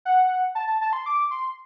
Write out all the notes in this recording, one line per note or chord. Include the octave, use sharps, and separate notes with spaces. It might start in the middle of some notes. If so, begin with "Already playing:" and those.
F#5
A5
A5
A5
C6
D6
C6